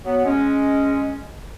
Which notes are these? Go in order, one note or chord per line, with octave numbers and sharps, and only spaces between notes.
F#3 B3
G#3 C#4